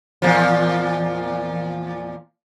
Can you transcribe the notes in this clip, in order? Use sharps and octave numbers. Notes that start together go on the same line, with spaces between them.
E2 A#2 F3